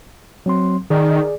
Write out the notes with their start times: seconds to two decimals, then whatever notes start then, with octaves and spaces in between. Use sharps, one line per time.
0.46 F#3 C4 C6
0.90 D#3 G#4 D5